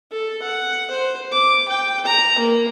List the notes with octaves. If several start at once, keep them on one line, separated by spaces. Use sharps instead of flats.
A4
F#5
C5
D6
G5
A#5
A#3